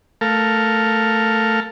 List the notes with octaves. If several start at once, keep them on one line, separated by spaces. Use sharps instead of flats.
A3 A4 A#4 F5